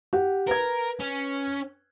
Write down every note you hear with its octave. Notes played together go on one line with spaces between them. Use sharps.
G4 F#5
A#4 B4 G#6
C#4